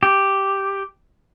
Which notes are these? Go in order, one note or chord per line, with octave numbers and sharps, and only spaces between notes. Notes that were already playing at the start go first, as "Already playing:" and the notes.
G4